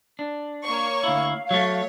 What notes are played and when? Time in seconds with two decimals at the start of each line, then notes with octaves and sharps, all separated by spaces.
0.19 D4
0.63 A#3 C#5 C#6
1.04 D2 E4 F5
1.51 F#3 A3 C#5